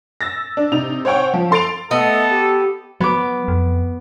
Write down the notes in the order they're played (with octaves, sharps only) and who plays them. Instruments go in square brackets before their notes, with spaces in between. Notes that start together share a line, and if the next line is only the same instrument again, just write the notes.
[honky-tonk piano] E6 A6 A#6
D4
C3 D#4 F7
C5 C#5 F#5 G5 C#6
F3
A4 C6 A6 D7 F7
[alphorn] A3 [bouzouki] B3 [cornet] A4 [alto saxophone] D#5
[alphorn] G4
[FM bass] F#3 [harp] B3 D6
[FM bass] F2